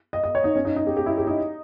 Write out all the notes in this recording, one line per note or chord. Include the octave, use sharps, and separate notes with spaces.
D#5
D#5
C#5
D#4
C#4
D#4
D#4
G4
G4
E4
G4
D#4